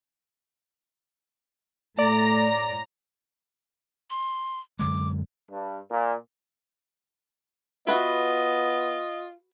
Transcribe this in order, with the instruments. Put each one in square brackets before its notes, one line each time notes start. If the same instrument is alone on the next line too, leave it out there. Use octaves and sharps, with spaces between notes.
[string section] A2 A#5 A#6 [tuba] A3 [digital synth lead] D5
[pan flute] C6
[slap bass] F#2 D3 G#3 [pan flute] D6
[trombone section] G2
A#2
[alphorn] B3 [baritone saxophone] F4 [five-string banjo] F#4 B4 E5 [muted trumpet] D#5